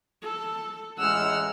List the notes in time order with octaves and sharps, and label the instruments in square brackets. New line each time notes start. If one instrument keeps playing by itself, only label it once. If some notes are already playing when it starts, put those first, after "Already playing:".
[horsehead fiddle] A4
[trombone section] A1 G#3 [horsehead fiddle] F#5 [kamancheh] E6 F6